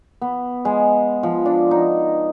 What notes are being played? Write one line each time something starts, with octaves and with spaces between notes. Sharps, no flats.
B3
G#3
F3
D4
D#4